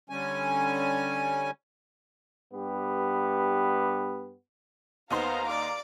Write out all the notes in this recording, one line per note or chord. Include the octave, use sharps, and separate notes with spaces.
D3 G3 C#4 G#5
G2 B3 G4
D#2 B3 D#4 C5 F5 A#5 C6
D5 D6